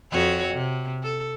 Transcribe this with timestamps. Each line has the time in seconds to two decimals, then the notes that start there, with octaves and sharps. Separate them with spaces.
0.12 F2 F#4 C#5
0.54 C3
1.03 A4